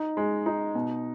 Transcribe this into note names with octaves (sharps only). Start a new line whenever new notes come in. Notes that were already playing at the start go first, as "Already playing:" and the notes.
Already playing: D#4
G#3
D#4
B2